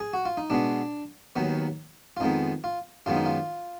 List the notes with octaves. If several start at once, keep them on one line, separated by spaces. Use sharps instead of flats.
G#4
F#4
F4
D#4
B2 G#3 B3 D4
D#2 D#3 F#3 B3
F4
F2 D#3 G#3 B3 D#4
F4
F#2 D#3 G#3 B3 F4
D#4
F4